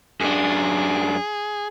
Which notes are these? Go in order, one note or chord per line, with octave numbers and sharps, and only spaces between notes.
F#2 D4 G#4